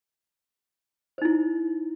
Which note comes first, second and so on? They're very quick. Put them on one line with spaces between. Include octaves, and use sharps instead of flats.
C5 D#4 E4